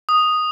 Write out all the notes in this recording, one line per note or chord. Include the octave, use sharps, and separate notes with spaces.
D#6